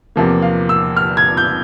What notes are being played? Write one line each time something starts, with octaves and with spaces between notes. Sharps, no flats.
E2 C3 F3 A#3
F5
E6
F6
G#6
G6